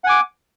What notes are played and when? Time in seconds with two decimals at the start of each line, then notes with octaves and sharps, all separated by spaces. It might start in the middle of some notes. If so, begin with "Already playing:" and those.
0.04 F#5
0.07 G#5
0.09 D6